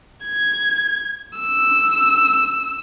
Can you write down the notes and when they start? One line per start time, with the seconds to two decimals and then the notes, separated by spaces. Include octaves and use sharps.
0.25 G#6
1.39 E6